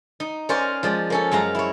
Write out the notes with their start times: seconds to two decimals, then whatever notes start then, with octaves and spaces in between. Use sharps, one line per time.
0.20 D#4
0.49 C#4 A#4 C5 D5 F5 G#5
0.83 F3 G#3 D5
1.10 A#3 C#4 A4
1.32 F#2 G#3 F5 A#5
1.55 E4 C#5